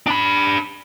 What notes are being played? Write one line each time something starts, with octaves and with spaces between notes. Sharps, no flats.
D4 B5